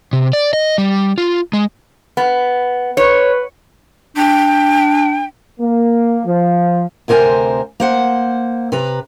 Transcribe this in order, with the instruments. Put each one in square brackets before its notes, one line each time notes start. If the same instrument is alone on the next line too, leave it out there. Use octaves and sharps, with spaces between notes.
[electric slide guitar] C3
D5
D#5
G3
F4
G#3
[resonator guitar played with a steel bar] B3
[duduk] B4 [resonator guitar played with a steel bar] C#5
[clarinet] D4 [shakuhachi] G5
[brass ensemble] A#3
F3
[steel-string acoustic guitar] D2 C3 A#4 C5 G#5
A#3 C5 F#5
C3 B4 A#5